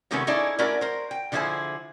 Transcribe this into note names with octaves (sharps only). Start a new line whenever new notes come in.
C3 D#3 G#3 A3 B3 C#4
C#4 D#4 E4 G#4 A4 D5
A3 C#4 E4 F#4 A#4 D5
A#4 C5
G5
D3 F3 D4 E4 G#4 C5